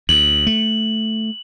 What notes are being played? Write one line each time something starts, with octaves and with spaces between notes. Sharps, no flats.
D2 F#7
A3